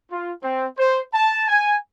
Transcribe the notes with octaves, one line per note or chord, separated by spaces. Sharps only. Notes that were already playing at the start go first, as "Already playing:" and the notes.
F4
C4
C5
A5
G#5